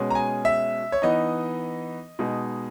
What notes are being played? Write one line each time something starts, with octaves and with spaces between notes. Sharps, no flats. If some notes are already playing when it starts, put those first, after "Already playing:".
Already playing: B2 G#3 C#4
A#5
G#5
E5
C#5
E3 B3 D#4 D#5
B2 G#3 D#4